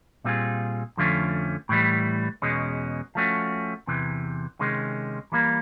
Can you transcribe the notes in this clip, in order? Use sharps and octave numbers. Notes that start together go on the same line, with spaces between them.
A#2 G3 C4 F4 G#4
F2 D3 F3 A3 C#4
A2 E3 G3
E2 B2 G#3 C#4
F3 A3 C#4 F#4
E2 C3 E3
C3 D#3 G#3 C#4
E3 G3 A#3